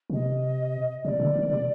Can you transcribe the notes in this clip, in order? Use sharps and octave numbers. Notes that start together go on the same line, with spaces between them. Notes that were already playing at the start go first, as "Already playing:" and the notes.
D3
C3 D#5
C3 D5
D3
D#3
C3